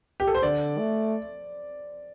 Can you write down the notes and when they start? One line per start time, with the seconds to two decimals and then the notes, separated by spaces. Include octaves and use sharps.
0.20 G4
0.27 A4
0.35 C5
0.43 D3 D5
0.78 A3